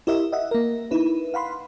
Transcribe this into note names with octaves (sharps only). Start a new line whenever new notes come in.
E4 G4 A#4 D#5 E5
D#5 E5 F#5
A#3 A#4
D#4 E4 B4
F5 F#5 B5 C6